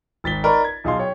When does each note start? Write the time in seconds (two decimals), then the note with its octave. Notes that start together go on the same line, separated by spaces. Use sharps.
0.24 G#1 A6 B6 G7
0.44 D#4 A#4 B4 D5 B5 C#6
0.65 G#6
0.84 B1 D#4 G#4 F5 C6
0.99 C#5 G5